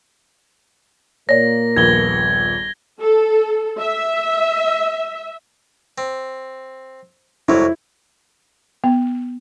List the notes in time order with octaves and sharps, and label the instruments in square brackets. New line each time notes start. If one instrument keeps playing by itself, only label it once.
[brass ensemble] A#2 A#3 [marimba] C#5 D5 [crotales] A#6
[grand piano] D#1 A#1 B3 [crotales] G#6 G7
[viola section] A4
E5
[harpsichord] C4
[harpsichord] C2 F2 F#3 [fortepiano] E4
[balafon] B3